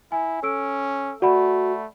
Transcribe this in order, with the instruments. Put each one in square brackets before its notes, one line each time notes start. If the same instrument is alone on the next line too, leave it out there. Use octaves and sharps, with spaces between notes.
[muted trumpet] E4 [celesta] G#5
[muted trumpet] C#4 [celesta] A4 E6 D7
[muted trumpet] A3 [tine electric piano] F#4 [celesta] D5 F#5 B5